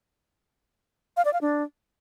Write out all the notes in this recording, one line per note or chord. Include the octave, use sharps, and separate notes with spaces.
F5
D5
F5
D4